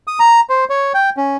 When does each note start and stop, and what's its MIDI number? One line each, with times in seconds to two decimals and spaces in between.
0.07 0.19 87
0.19 0.40 82
0.49 0.65 72
0.69 0.92 73
0.94 1.10 79
1.17 1.37 61